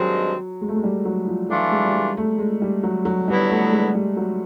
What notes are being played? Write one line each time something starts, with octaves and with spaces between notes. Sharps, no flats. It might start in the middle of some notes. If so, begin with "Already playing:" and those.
Already playing: G2 D#3 F#3 G#3 C4
G#3
A3
G#3
G3
F#3
F3
E3 F#3 A3 D4 F4
G#3
G3
G#3
A3
G#3
G3
F#3
F#3
D3 F#3 G3 B3 E4
A3
G#3
G3
F#3